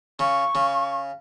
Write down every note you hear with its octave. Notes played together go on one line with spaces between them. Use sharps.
C#3 C#6
C#3